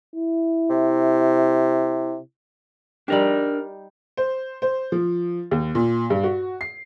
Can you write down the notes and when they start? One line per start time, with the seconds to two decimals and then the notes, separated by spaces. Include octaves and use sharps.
0.16 E4
0.70 C3
3.08 G3 D4 D#4 G4 A#4 D5
4.17 C5
4.62 C5
4.92 F3
5.51 D#2
5.75 A#2
6.10 G2
6.24 F#4
6.61 C7